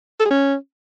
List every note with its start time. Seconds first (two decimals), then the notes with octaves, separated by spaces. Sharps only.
0.20 A4
0.25 G#4
0.30 C#4